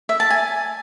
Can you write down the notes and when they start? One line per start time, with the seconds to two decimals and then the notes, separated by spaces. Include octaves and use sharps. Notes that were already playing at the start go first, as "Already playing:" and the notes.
0.09 E5
0.20 A5
0.30 G#5